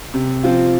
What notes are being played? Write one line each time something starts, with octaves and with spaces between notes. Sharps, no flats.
C3
F3 C4 F4